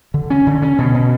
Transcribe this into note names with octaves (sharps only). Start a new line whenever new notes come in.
D3
C#4
D3
C#4
B2
B2